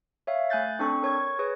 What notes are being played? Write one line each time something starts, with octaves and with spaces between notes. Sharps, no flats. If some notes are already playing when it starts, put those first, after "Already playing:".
C#5 E5 F5
A3 G#5 F#6 G6 A6
C4 D4 A4 C#6
A#4 C#5 C#6 G#6
G#4 B4 C#5